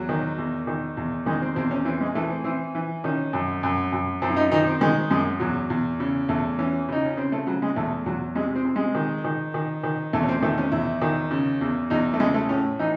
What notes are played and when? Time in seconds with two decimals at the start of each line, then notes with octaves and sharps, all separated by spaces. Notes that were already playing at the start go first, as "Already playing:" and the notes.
Already playing: E2 F#3
0.09 D#3
0.38 E2
0.67 D#3
0.97 E2
1.26 D#3 G#3
1.42 C4
1.56 E2 C4
1.71 C#4
1.85 E3 C4
2.01 G#3
2.15 E3 A3
2.29 C4
2.44 E3 C4
2.75 E3
3.04 D#3 C#4
3.33 F#2
3.63 F#2
3.92 F#2
4.22 F#2 C4
4.29 E4
4.36 D#4
4.51 D#3 D#4
4.67 C4
4.81 D#3 G#3
5.10 F#2 G#3
5.40 E2 F#3
5.70 E2
6.00 C#3
6.29 E2 A3
6.59 E3 C#4
6.88 C#3 D#4
7.06 C#4
7.17 C#3 C4
7.32 A3
7.47 C#3 F#3
7.62 G#3
7.76 E2 A3
8.06 E2 F#3
8.35 C3 G#3
8.55 C4
8.65 C3
8.76 G#3
8.95 D#3
9.24 D#3
9.54 D#3
9.83 D#3
10.13 E2 A3
10.23 C#4
10.29 C4
10.42 D#3 A3
10.58 C#4
10.72 E2 E4
11.02 D#3
11.31 C#3
11.61 E2
11.90 E2 D#4
12.14 A3
12.20 C#3 G#3
12.34 A3
12.49 A2 C#4
12.79 E3 D#4